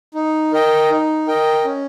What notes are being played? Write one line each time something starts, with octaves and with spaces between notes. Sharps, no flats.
D#4
A#4 D#5 G5
D#4
A#4 D#5 G5
C#4